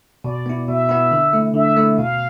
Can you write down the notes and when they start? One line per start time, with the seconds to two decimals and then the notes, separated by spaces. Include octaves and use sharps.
0.24 B2 D5
0.46 B3 E4
0.68 B2 E5
0.89 B3 E4
1.12 D3
1.33 A3 E4
1.54 D3 E5
1.76 A3 E4
1.97 B2 F5